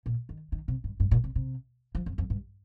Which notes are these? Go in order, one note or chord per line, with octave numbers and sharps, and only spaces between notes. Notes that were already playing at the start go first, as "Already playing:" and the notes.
A#2
D#3
D#3
C3
G2
G2
A#2
C3
C3
F3
F2
F2
G2